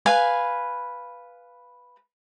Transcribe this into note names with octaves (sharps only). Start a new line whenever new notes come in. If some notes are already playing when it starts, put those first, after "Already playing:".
B4 F5 G#5